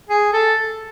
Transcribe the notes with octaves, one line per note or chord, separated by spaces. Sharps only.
G#4
A4